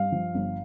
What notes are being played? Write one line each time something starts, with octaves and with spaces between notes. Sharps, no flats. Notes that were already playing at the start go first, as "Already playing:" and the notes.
Already playing: G2 F5
F3
G1